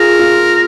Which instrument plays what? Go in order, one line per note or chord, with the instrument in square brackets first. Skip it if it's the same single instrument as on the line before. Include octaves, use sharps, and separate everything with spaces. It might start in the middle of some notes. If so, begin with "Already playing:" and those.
Already playing: [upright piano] F4 G#4 [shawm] A#4
[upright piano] F4